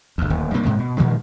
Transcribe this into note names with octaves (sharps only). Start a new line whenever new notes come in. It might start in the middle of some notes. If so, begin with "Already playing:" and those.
G1 D2
D1 D#2
G2 C3 A#3
G#2 C3 G#3
B2
A#2 D#3 F3 G#3